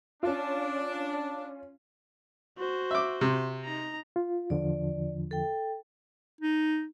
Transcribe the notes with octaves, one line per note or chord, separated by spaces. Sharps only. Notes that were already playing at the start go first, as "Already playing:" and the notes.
C#4 D4 F4
F#4 C5
E5 D6
C3
D#4 A#5
F4
E2 D3 F3 D5
A4 G5
D#4